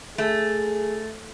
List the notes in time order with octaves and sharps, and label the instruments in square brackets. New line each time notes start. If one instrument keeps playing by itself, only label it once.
[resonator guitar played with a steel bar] A3 [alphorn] G#4